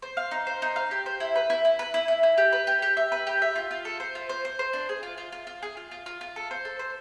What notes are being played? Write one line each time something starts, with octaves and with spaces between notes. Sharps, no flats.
C5
F5
D#4
C5
D#4
F5
G4
C5
E4
B4
E4
E4
B4
E4
E4
E4
G4
B4
G4
G4
E5
B4
G4
E5
F4
F4
A4
C5
F4
C5
C5
C5
D4
G#4
F4
F4
F4
F4
G#4
F4
F4
F4
F4
A4
C5
A4
C5